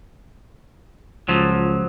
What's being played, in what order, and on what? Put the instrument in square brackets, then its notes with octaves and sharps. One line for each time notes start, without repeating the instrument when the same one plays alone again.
[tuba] C#2 [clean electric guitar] F3 F#3